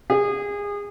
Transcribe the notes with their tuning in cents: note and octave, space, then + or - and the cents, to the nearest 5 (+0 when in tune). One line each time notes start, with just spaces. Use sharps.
G#4 -30